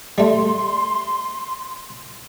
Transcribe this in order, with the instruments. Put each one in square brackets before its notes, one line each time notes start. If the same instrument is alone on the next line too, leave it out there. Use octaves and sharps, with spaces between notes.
[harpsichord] G3 A3 [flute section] C6